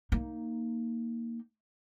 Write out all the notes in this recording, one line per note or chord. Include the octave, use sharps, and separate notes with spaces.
A#3 D#4